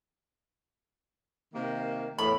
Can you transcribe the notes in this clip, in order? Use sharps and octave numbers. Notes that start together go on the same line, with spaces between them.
C3 D#3 A#3
E2 A2 B5